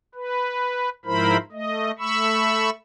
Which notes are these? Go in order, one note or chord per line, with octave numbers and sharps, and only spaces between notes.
B4
G#2 F3 E4 A#4 C5 B5
A3 D#5
A3 B5 C#6 E6